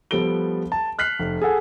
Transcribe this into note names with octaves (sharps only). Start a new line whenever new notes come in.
F3 G3 B3 A4 D7 G7
A5
F6 F#6 B6 C7
F1
G#4 A4 F#5 G#5